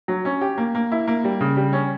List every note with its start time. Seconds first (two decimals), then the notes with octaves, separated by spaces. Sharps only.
0.08 F#3
0.25 C#4
0.41 G4
0.58 A#3
0.75 A#3
0.92 E4
1.07 A#3
1.24 G3
1.41 C#3
1.57 G3
1.73 C#4